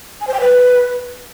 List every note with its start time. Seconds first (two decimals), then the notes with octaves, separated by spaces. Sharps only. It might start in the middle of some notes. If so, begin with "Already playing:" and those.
0.21 G#5
0.27 C5
0.34 G5
0.40 B4